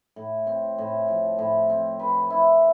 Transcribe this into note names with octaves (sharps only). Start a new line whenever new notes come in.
A2
C4
A2
F3
A2
C4
B4
E4